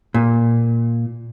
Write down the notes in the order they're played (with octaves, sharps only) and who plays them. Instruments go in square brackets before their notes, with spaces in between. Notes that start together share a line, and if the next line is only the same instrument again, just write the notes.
[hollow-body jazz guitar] A#2